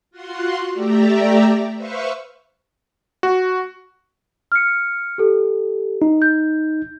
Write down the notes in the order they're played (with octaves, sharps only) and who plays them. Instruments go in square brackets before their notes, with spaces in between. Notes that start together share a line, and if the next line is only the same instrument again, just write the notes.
[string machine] F4 F#4 F#5 C6
A3 G4 D5 E5 A#5
B4 C5 E5 F5 C#6
[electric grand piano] F#4
[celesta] F6 C#7
G4 A4
[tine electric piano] D#4
[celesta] G6